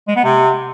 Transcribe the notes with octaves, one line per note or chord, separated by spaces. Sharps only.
G#3
B3
C3